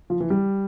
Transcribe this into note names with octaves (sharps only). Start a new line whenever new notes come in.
F3
E3
G3